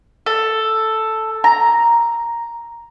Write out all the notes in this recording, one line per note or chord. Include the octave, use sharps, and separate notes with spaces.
A4
A#5